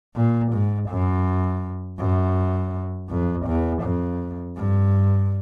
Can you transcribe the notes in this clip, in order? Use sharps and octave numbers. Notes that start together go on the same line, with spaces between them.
A#2
G#2
F#2
F#2
F2
E2
F2
G2